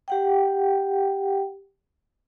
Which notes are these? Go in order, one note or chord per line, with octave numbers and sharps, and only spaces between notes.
G4 F#5 G5